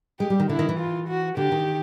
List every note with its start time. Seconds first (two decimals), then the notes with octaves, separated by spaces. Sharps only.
0.20 G#3 G4
0.30 G3
0.40 D#3
0.49 D3 E4
0.59 D#3
0.69 E3
0.79 F4
1.08 F#4
1.37 D3 G4
1.52 D#3